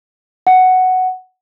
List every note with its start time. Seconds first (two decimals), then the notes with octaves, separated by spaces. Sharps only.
0.47 F#5